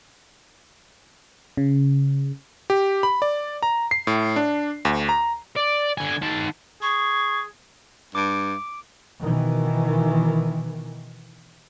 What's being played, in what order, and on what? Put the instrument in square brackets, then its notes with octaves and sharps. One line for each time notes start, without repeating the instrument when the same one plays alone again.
[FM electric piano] C#3
[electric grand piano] G4
B5
D5
A#5
C7
A2
D4
D2
A#5
[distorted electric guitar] D5
D3 G#5
D#3 A5
[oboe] G#4 [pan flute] C#6
[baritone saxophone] G2 [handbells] D6 D7
[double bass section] B2 D#3 E3